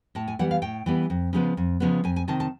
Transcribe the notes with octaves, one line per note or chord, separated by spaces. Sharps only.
A2 A5
G#5
E3 G3 B3 F#5
F5
A2 G5
E3 G3 B3
F2
C#3 F3 G#3 B3
F2
C#3 F3 G#3 B3
F2 G#5
G#5
C3 D#3 A5
A5